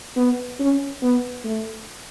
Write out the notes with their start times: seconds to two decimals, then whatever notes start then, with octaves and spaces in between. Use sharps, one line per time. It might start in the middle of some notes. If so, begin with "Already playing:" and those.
0.17 B3
0.60 C#4
1.03 B3
1.45 A3